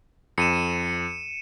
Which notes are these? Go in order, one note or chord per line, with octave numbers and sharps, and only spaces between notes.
F2 C#7 D#7 E7